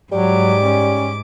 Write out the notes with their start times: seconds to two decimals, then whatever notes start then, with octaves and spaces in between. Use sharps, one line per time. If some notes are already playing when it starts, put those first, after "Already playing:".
0.12 G#2 F#3 G3 D6
0.61 C#4